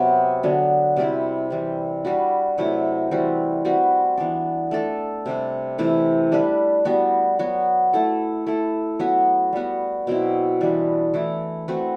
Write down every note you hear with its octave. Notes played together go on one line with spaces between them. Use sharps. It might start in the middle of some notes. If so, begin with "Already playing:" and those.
Already playing: C3 F#3 B3
D3 F#3 B3 D4
C3 G3 C4 E4
E3 G3 C4
G3 D4 F#4 B4
C3 F#3 A3 E4
E3 G3 C4 F#4
G3 C4 F#4 B4
E3 B3 D4
A3 D4 A4
C3 G3 D4
C3 E3 A3 E4
G3 D4 G4 B4
G3 B3 F#4
F#3 B3 F#4
A3 E4 A4
A3 E4 A4
F#3 B3 F#4 B4
G3 B3 F#4
B2 F#3 C4 E4
E3 G3 D4
E3 A3 E4
A3 C4 F#4 B4